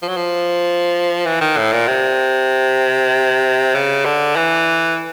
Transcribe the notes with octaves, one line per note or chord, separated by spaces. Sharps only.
F3
F#3
F3
E3
D#3
A2
A#2
C3
C#3
D3
E3